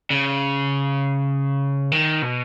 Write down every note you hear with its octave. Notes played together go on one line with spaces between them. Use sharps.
C#3
D#3
B2